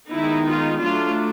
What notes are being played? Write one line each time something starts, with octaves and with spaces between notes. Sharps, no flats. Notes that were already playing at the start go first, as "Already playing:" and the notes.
D#3 G#3 B3 D#4 E4
F4
F#3 A3 D4 F4